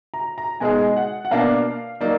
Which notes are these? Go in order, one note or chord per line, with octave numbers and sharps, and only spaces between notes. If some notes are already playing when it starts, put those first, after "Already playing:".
A#5
A#5
B2 G#3 D#4 G#4 G#5
F#5
F#5
B2 A#3 D4 F5
F#3 A#3 D#4 D5